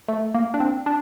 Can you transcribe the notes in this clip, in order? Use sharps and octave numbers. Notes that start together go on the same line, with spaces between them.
A3
A#3
D4
C4
D4